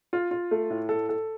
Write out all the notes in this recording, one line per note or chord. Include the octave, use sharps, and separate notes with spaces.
F4
F4
A3
A2
A4
A4